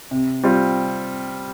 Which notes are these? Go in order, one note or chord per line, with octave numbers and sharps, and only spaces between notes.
C3
G3 C4 F4